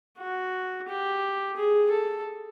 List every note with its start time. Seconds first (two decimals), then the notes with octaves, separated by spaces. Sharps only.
0.19 F#4
0.88 G4
1.56 G#4
1.91 A4